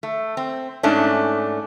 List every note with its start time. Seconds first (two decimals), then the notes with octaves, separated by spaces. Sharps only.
0.03 A3
0.37 C4
0.83 G#2 A3 C#4 D4